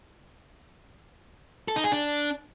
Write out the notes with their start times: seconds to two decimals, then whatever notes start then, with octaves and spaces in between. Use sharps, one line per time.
1.68 A4
1.76 D#4
1.84 G#4
1.92 D4